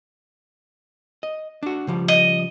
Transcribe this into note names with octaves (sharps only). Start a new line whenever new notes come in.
D#5
D4 F#4
C#3 F3 G3
D#5